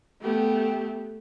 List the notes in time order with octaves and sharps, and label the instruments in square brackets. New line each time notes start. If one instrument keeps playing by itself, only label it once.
[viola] A3 [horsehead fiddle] B3 G4